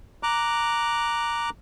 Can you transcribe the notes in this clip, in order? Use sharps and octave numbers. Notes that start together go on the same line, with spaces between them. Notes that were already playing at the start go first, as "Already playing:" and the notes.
A#5 D6 F#6